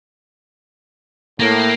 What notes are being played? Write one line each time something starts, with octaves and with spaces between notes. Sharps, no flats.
A2 A#3